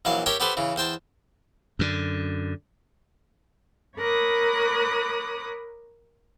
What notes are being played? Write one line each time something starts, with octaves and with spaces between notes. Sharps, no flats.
A#1 E3 F#3 F5
G4 A#4 C#5 E5 G5
B3 G4 A4 B4 C5
C#3 E3
E2 C5 G5 A5
F#2 D3
A#4 C#5 B5 D6 D#6 F#6